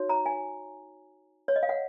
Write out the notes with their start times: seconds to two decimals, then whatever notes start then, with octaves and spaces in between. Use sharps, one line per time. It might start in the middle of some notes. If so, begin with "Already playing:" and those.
Already playing: D#4 F#4 C#5
0.09 A#5
0.26 G#5
1.48 C#5
1.56 D#5
1.63 F5
1.69 F#5